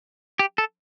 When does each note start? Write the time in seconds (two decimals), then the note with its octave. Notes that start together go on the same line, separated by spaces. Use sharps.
0.39 G4
0.58 A4